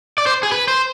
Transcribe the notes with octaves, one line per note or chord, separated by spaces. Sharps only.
D5
C5
G#4
B4
C5